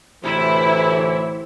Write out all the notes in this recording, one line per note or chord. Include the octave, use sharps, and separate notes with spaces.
D2 A2 C3 E3 E4